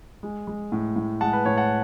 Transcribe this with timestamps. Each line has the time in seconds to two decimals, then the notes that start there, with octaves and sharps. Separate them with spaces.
0.23 G#3
0.47 G#3
0.72 A2
0.96 A2
1.21 G#3 F#5 A5
1.33 B4
1.45 A2 C#5
1.57 F#5 A5